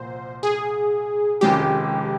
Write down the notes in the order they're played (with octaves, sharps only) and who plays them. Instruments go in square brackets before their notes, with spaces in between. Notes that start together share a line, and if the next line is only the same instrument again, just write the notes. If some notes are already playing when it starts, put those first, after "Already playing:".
Already playing: [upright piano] C2 A#2 F3 A#3 [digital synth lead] C5
[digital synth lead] G#4
[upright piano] F1 F2 D#3 G#3 C#4 [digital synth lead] G4